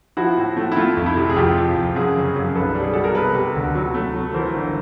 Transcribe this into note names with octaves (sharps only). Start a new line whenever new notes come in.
F3 E4 F#4
A2
A3
E4
A3 F4
F2
E4
C3
G#4
F2 F4 G4
F3
F2
F#2 F#4 G#4
C#3
F#2
B1 A4 B4
G3
G#4
B2 A4
A#4
C3 A4 B4
C3
D2
F#3
A3
F#3
E3 A#4 C5
G1